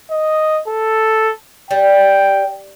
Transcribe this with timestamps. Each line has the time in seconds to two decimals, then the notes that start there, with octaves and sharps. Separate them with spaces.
0.11 D#5
0.68 A4
1.71 G3 G5